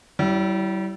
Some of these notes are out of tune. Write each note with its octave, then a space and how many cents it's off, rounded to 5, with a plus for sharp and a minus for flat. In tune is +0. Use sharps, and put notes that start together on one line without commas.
G3 -35 C#4 +0 E4 +0